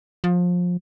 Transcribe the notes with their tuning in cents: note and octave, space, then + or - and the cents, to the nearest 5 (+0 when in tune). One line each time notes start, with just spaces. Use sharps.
F3 +25